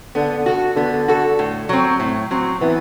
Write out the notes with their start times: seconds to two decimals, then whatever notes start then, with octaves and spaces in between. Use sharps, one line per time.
0.15 D3 B3
0.46 F#4 A4
0.76 D3 B3
1.08 F#4 A4
1.39 A2
1.69 F#3 C4
2.00 A2
2.31 F#3 C4
2.61 E3 B3